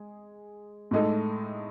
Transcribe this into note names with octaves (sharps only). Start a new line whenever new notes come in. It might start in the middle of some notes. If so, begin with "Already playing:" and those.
Already playing: G#3 G#4
A2 G#3 D#4 A4